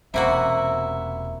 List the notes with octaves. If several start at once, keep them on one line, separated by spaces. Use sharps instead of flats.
E1 C3 A#3 C#4 E4 F#4 E5 F#5